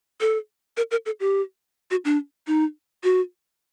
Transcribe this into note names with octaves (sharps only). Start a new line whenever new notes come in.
A4
A#4
A#4
A4
G4
F#4
D4
D#4
F#4